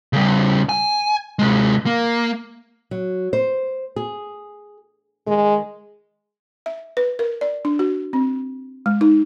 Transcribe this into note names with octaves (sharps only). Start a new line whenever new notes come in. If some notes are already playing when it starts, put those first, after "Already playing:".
C#3 G3
G#5
C3 G#3
A#3
F#3
C5
G#4
D#3 G#3
E5
B4
A#4
D5
D4
F#4
C4
G#3
D#4